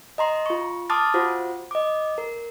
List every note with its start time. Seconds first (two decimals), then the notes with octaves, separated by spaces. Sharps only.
0.18 D#5 A#5 C6
0.46 F4 C#6
0.90 A5 C6 D6 D#6 F6 A6
1.14 F4 F#4 C5
1.71 D#5 D6
2.18 A#4